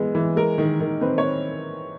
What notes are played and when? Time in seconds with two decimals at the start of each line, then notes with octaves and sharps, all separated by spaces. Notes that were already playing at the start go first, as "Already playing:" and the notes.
Already playing: E3 G#3 B3
0.15 E3
0.36 G#3 A#4
0.58 D#3
0.80 D#3
1.01 C4 B4
1.18 C#5